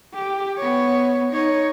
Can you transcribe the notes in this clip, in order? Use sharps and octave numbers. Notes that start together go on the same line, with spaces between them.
G4
B3 C#5
D#4 C#5